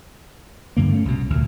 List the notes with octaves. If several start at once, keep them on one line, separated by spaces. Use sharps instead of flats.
D2 G2 D3 A#3
A3 C#4
C2 B2
D2 A#2